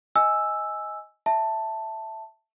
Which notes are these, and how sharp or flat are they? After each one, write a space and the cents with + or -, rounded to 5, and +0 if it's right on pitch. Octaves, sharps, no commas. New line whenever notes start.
D#5 +10 G#5 +0 E6 +0
E5 +0 A5 +5